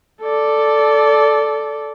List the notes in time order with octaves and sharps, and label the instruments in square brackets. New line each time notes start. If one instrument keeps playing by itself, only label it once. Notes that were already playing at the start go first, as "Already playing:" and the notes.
[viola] A4 D5